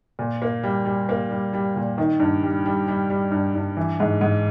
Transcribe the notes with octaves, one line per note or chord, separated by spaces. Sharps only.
A#2
A#3
G3
G3
A#3
G3
G3
A#2
D#3
G2
G3
G3
G3
G3
G2
G2
E3
G#2
G#2